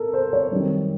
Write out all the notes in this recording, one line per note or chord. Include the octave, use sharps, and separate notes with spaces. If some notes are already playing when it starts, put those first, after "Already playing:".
Already playing: A4 A#4
C5
C#5
F#2 D#3 G3 C4